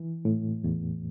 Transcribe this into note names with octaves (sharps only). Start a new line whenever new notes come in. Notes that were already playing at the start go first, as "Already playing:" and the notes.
Already playing: E3
A2
E2